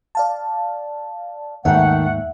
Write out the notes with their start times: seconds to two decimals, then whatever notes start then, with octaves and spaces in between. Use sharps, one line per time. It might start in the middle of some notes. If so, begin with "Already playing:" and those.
0.15 D5 F5 A5
1.65 D#2 G#2 D#3 A3 E5 F#5